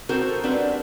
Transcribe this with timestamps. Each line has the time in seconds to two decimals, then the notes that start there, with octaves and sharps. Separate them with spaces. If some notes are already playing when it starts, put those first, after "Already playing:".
0.09 C4 D#4 F#4 A4 A#4 C5
0.43 G3 C4 D4 A#4 B4 F#5